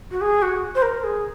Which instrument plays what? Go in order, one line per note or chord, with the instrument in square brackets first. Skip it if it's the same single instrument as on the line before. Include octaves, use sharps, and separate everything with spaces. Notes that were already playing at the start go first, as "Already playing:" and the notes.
[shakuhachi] F#4
G#4
F#4
C5
A#4
G#4